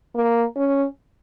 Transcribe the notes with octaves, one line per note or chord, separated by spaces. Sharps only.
A#3
C#4